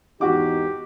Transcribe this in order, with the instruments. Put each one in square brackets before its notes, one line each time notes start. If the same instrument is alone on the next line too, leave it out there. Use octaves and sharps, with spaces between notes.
[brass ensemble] G#1 E2 D#4 [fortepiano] F#4 F#5 D6 [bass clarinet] G4